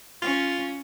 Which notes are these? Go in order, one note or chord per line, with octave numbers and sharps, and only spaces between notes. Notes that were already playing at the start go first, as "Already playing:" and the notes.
C#4 F4